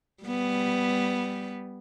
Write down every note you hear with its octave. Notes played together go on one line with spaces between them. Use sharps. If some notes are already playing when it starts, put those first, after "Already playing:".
G3 B3